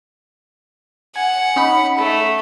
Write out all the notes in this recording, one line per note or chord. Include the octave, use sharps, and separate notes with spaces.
F#5 G#5
C#4 D#4 B5
A3